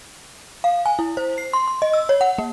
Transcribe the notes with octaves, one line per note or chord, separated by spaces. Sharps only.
F5
G#5
E4
C5
C7
C6
C6
D#5
E6
C#5
F#5
A#3